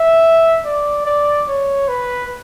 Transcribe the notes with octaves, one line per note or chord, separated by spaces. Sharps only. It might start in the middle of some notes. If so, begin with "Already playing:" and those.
Already playing: E5
D5
D5
C#5
B4